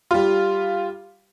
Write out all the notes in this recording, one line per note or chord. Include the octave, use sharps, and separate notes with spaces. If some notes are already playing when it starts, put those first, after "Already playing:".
G3 F4